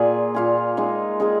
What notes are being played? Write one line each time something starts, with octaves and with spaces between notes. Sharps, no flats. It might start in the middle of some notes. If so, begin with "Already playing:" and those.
Already playing: A#2 A#3 F4 G#4
A#2 A#3 F4 G#4
G#3 D#4 G#4
G#3 D#4 G#4